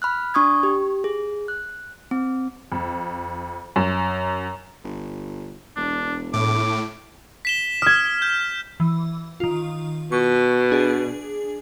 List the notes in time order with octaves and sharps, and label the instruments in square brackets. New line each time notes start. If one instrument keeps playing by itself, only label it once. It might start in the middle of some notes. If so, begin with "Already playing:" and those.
[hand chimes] B5 F6 F#6
D4 C#6 D#6 G#6
G4
G#4
F#6
C4
[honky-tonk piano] F2
F#2
[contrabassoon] G1
[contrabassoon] E1 [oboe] D4
[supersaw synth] A2 [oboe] D6
[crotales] B6 E7 G7
[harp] D#6 G#6 [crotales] F6
[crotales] G6
[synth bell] E3
D#3 F4
[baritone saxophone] B2 [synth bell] C#6
[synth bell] D4 G#4